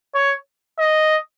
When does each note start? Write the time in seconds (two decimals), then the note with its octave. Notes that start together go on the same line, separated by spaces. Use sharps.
0.15 C#5
0.79 D#5